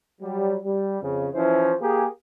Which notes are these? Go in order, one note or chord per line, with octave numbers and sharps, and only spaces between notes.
F#3 G3
G3
F2 C#3
E3 F3 C#4 E4 C5
A#3 G4 G#4